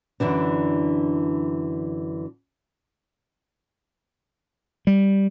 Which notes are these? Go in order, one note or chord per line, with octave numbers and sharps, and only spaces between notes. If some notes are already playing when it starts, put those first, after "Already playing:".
F#2 D3 E3 D4
G3